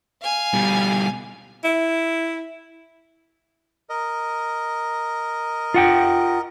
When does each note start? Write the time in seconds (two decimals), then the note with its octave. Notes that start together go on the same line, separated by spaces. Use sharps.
0.22 F5 G#5
0.54 B2 G3
1.64 E4
3.90 A#4 D#5
5.74 F4 F#5 G5